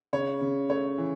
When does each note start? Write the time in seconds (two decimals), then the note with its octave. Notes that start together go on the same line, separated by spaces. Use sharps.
0.13 C#3 C#5
0.41 C#3
0.70 A3 C#5
0.98 E3